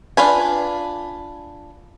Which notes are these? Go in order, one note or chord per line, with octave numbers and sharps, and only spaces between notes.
D4 F4 B4 G#5